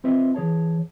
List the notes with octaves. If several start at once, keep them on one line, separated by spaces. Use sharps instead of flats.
C4 F4 B4 C5 D#5 E5
E3 G#4 C#5 A5